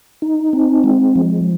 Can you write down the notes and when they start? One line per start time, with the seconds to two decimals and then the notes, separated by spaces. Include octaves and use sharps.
0.22 D#4
0.53 C4
0.84 G#3
1.16 F3